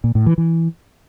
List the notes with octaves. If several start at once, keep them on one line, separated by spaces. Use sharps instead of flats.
A#2
A2
E3
E3